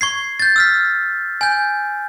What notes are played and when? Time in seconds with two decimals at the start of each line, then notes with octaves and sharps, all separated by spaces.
0.01 C#6 G#6 C7
0.40 G6 A6
0.56 E6 F6 B6
1.41 G#5 G6